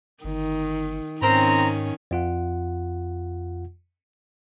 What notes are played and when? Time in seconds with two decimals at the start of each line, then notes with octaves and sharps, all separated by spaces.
0.24 G1 D#3
1.21 G#2 D#3 C4 C#4 A#5
2.11 F2 F4 F#5